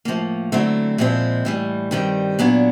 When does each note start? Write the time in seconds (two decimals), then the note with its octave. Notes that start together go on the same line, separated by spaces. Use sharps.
0.05 A2 F3 A#3
0.52 D3 F#3 A3 C4 E4
0.98 A#2 F3 G#3 C4 E4
1.45 A2 E3 G3
1.91 G2 D#3 G3 C4
2.39 A#2 F#3 B3 D4